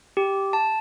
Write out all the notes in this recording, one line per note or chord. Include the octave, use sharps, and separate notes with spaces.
G4
A5